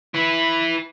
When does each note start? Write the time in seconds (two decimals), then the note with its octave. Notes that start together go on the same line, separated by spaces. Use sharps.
0.15 E4 B4